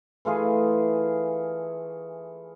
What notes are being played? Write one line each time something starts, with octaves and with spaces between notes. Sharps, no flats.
E3 A3 F4 G#4